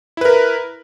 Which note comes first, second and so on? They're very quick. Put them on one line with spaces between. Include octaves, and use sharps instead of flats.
E4 B4 A#4